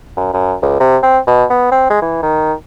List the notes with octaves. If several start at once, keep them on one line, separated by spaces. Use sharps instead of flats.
F#2
F#2
C#2
C3
C4
B2
B3
C4
G#3
E3
D#3